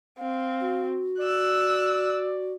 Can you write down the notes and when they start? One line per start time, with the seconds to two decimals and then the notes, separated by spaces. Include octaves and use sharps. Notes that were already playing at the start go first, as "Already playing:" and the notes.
0.19 C4 F5
0.61 F#4
1.20 D5 E6 F#6